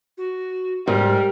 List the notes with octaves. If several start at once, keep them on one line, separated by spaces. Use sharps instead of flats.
F#4
G#2 G3 A#4